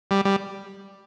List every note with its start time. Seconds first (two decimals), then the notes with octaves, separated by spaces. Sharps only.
0.11 G3
0.25 G3